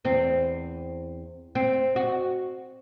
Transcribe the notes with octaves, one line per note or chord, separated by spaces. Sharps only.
E2 C4
C4
F#4